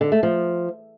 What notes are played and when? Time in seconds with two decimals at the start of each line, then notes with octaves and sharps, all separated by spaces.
0.01 D3
0.12 A3
0.23 F3